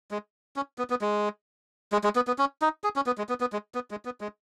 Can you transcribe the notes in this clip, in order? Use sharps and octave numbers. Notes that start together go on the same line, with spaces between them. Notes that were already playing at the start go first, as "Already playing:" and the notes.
G#3
C#4
B3
B3
G#3
G#3
G#3
B3
B3
C#4
D#4
G#4
C#4
B3
G#3
B3
B3
G#3
B3
G#3
B3
G#3